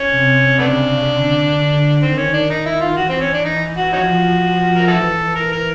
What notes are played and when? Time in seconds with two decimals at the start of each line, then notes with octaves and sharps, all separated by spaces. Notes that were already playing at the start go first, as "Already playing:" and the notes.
Already playing: C#4
0.11 C3
0.59 C#3 A3 B3 D4
1.07 D3
2.02 D#3 C4
2.18 C#4
2.33 D4
2.49 D#3 D#4
2.66 E4
2.81 F4
2.97 E3 F#4
3.09 C4
3.21 C#4
3.33 D4
3.45 D#4
3.77 F#4
3.93 F3 C#4 D#4 F#4
4.76 A#4
4.88 E3 E4 F#4 A4
5.36 A#4
5.52 A#4